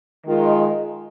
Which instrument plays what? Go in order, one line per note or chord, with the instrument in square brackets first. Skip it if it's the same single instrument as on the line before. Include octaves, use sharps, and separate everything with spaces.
[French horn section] D#3 G#3 F4